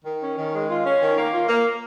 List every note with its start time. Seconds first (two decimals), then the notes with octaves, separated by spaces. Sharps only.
0.05 D#3
0.21 C#4
0.37 D#3
0.54 G#3
0.69 F4
0.85 C#4
1.02 D#3
1.17 A#3
1.32 F4
1.49 A#3